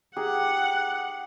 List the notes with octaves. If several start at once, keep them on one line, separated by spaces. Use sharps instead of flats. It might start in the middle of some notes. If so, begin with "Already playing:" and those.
D#4 G4 G#4 F#5